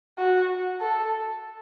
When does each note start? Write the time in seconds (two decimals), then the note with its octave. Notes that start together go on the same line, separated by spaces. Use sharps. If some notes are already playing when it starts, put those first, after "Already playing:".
0.18 F#4
0.81 A4